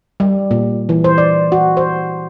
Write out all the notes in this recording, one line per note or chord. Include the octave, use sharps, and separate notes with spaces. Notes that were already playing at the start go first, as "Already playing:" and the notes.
G3
A#2
E3
C5
D5
F#4
C5